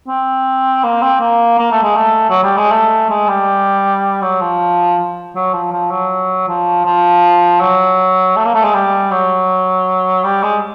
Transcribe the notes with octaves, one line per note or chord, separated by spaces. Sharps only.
C4
A#3
C4
A#3
A#3
A3
G#3
A3
F#3
G3
G#3
A3
G#3
G3
F#3
F3
F#3
F3
F3
F#3
F3
F3
F#3
A3
A#3
A3
G#3
G3
F#3
G3
G#3